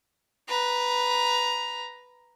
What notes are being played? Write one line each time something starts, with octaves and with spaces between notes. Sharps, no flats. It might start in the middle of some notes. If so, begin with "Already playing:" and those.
B4 A#5